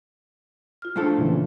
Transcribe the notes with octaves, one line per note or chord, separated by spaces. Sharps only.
F4 F6
A2 F3 A3 D4 A4
A#2 C#3 E3